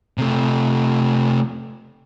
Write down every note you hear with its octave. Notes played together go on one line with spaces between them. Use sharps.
C3 A3